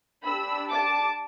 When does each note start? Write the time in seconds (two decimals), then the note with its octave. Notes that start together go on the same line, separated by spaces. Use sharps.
0.23 D4 G4 B5 E6
0.70 A5 D6